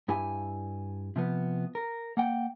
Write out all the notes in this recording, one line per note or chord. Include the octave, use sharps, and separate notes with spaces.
G2 E4 G4 G#5
C3 F3 B3
A#4
A#3 F#5 G5